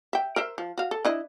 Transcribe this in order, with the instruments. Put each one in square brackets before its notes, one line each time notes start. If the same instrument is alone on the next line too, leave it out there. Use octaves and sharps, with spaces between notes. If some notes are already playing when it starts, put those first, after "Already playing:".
[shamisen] E5 G5
A#4 C5 E5
F3
F#4 F5
A4
D4 E4 D#5